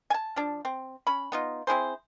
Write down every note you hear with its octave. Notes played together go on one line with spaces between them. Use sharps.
G#5 A5
F3 D4
C4
C#4 B5
B3 D#4 F4
C4 E4 G#4 C5